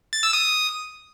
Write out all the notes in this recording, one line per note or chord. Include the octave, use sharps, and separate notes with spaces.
A6
E6
D#6